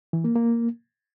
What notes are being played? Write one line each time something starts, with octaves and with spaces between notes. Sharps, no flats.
E3
A#3
A#3